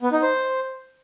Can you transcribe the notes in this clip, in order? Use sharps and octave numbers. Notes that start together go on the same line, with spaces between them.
B3
D#4
C5